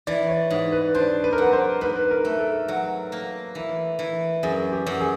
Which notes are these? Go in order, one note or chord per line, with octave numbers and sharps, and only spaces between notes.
E3 D5
C#5
G#2
B4
D4 C5
B4
A#4
F#3 B4
C5
G#2 B4
A#4
A3
A4
F#3
A#3
E3
E3
F#2 G#4
G4
F#2
G#4